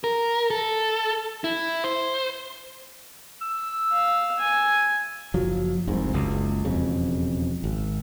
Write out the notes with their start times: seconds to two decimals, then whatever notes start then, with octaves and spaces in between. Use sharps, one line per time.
0.04 A#4
0.50 A4
1.44 E4
1.84 C5
3.41 E6
3.93 F5
4.39 G#5
5.34 F#1 F3 F#3
5.87 F1 C2 G#2
6.13 F#1 C#2
6.65 E1 F2 C#3
7.64 G#1